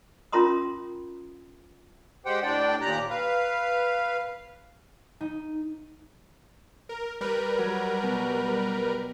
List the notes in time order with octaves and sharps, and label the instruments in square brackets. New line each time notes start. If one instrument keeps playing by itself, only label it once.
[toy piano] C#4 F4 A#4 A#5 C6 D#6
[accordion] G#3 G4 C5 F#5 G5
A2 D4 D5 G5
D#2 A#2 G4 A#5 F#6
B4 F5
[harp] D#4
[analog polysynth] A#4
G3 A#4 B4
[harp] F#3
B2